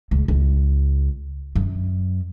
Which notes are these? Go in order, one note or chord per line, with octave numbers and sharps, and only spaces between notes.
C#2
C#2
F#2